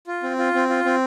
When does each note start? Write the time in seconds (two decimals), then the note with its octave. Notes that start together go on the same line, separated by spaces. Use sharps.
0.07 F4
0.23 C4
0.39 F4
0.54 C4
0.70 F4
0.85 C4